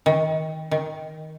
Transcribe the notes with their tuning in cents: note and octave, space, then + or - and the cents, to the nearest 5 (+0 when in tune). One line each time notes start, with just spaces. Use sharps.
D#3 +25
D#3 +10